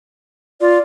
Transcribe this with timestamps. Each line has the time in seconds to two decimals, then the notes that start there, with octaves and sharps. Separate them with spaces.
0.61 F4 D5